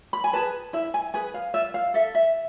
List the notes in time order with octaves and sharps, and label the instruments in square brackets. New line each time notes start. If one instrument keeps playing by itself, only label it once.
[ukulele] B5
G#5
G#4 B4 A5
E4 E5
G#5
G#4 B4 G#5
F5
F4 E5
F5
A4 E5
E5